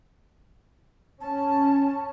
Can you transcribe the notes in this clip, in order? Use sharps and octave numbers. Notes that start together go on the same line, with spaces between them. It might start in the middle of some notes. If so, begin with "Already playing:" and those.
C#4 A5